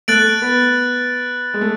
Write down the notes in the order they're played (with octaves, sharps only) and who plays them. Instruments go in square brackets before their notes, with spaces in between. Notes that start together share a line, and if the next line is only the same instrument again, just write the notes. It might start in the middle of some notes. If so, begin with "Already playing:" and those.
[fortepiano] A3 [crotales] F#6 A6 D7 F#7
[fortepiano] B3
G#3
A3